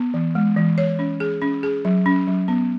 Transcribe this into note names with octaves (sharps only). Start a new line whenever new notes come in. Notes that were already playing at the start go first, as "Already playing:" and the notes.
Already playing: B3
E3
G#3
E3
C#5
C#4
G#4
C#4
G#4
F#3
C#4
F#3
B3